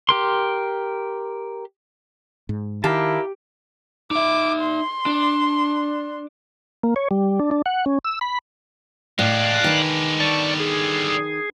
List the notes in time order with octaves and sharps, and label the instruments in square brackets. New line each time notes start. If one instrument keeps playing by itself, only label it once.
[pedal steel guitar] G4 A#4 C6
[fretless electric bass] G#2
[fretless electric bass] D#3 [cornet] E4 [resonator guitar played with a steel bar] G4 [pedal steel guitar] A#4 F5 A5
[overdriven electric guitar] D#4 E5 [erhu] D6
[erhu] C6
[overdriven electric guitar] D4
[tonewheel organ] A#3
C#5
G3
D4
D4
F#5
C#4
E6
B5
[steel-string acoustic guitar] A2 [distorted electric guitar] G#3 D4 [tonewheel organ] D5 F5 F#6
[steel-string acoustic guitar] D#3 B4
[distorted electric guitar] D3 G3 [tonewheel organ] D5 A5 C#6
[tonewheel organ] G#4